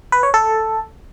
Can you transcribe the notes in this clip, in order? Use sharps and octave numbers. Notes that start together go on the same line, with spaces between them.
B4
C#5
A4